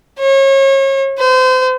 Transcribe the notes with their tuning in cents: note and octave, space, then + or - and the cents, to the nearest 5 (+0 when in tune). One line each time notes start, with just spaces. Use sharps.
C#5 -35
C5 -35